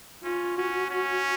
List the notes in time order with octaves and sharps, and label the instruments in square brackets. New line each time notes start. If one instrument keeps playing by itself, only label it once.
[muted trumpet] C#4 [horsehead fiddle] F4
[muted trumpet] C#4 [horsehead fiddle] F#4
[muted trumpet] C#4